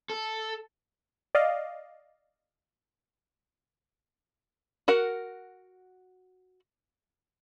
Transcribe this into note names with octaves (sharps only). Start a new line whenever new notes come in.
A4
D5 D#5 F5
F#4 A#4 F#5